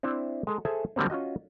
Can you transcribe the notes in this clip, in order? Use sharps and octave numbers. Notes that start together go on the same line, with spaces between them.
C4 D4 E4 C5 E5
G#3 A4
G#4 A4 C5 E5 G#5
D3 F#3 G3 A#3 C4
C#4 F4 F#4 D#5